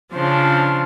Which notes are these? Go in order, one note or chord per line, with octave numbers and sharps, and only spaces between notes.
C#3 F3 D4 C5